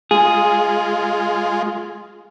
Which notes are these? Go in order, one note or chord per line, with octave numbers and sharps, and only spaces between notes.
G#3 F4 G#4